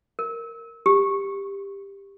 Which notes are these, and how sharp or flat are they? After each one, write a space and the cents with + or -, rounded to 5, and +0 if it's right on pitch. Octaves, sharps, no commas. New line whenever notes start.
A#4 -10
G4 +15